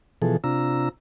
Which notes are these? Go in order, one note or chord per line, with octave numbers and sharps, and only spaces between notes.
B2 E3 F3 G#4 A4
C3 D4 F4 A#5 E6